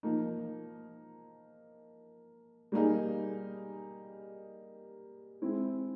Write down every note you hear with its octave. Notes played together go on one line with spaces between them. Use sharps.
F3 A#3 D#4
G3 A#3 D#4 G#4
G#3 C4 E4